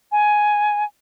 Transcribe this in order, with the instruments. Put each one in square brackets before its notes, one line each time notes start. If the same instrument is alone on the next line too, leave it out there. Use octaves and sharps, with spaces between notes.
[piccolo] G#5